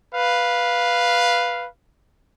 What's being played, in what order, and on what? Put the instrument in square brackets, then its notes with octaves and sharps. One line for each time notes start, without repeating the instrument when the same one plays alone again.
[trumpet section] B4 F5